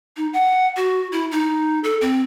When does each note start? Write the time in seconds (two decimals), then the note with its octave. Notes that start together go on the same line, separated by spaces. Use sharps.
0.17 D#4
0.33 F#5
0.76 F#4
1.12 E4
1.31 D#4
1.84 A4
2.01 C4